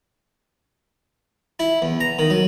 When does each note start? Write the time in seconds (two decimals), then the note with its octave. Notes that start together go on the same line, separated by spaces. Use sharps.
1.59 E4
1.82 E2
2.00 A#5
2.19 D#3
2.30 F#3